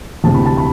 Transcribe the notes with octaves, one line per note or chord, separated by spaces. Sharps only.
D2 C3 E3 A5
B5
A5
B5